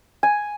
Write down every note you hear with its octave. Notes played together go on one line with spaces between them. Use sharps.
G#5